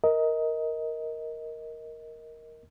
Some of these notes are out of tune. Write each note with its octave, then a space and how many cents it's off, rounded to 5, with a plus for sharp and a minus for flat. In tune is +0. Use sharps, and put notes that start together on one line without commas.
A#4 +0 D#5 +20